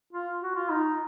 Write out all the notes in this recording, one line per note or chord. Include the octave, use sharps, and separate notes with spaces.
F4
F#4
F4
D#4